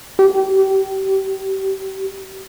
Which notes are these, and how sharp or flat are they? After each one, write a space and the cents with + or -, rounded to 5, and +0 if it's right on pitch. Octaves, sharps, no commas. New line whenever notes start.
G4 -30